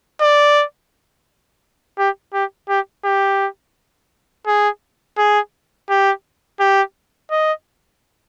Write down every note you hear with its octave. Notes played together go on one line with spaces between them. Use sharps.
D5
G4
G4
G4
G4
G#4
G#4
G4
G4
D#5